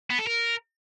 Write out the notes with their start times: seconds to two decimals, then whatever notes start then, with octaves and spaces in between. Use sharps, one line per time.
0.10 B3
0.19 A4
0.27 A#4